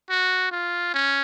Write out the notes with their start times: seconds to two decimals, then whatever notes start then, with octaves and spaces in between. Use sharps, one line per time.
0.09 F#4
0.51 F4
0.94 C#4